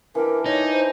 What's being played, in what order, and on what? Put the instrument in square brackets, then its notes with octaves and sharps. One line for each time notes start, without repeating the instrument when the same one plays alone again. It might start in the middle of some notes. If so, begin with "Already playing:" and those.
[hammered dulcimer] E3 D4 G4 [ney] A#4
[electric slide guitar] D#4 [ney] C#5
[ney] C5